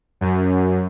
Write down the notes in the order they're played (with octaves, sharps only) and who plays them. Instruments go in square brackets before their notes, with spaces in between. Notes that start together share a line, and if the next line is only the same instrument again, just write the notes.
[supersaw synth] F#2